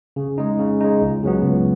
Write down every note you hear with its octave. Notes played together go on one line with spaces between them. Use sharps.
C#3
G#3 D#4
C#3
G#3 D#4
C#2
C#3 F#3 B3
C#2